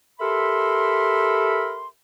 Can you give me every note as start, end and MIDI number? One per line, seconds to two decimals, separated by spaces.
0.20 1.87 67
0.20 1.87 69
0.20 1.87 70
0.20 1.87 76
0.20 1.87 83
0.20 1.87 84